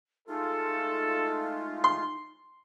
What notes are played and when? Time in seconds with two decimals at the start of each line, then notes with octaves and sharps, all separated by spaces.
0.28 G#3 A3 D#4 F4 A4
1.84 C6